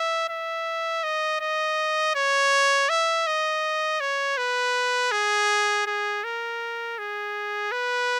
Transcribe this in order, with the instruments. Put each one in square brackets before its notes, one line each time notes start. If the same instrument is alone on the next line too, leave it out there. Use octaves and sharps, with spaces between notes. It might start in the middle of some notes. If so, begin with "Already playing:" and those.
Already playing: [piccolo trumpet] E5
E5
D#5
D#5
C#5
E5
D#5
C#5
B4
G#4
G#4
A#4
G#4
B4